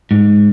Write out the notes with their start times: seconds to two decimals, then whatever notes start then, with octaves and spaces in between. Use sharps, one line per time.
0.11 G#2